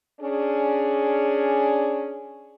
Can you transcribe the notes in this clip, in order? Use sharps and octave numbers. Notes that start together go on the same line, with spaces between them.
C#4 D4 G#4